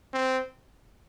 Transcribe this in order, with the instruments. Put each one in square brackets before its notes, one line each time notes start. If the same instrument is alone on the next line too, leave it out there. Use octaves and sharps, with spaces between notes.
[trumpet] C4